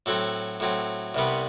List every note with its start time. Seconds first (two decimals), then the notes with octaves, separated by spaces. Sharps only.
0.06 A2 F#3 C4 F#4 A4
0.60 A2 F#3 C4
1.15 C2 C3 G3 B3